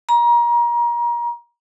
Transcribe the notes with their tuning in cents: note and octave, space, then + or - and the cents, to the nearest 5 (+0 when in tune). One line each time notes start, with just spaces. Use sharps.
A#5 +30